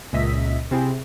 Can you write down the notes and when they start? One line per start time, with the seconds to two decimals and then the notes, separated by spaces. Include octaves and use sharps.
0.13 C#2 A#2 D#5 E5 B6
0.71 C3 C4 E4 G#4